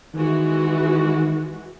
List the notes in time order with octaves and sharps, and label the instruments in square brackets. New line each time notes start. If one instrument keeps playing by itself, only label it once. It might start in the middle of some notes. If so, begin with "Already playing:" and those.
[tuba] D#3 [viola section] E3 G#3 F#4